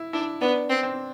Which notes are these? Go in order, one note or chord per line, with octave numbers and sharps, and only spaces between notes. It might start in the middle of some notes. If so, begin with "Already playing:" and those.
Already playing: E4
D4 E4
B3 D4
C4
C4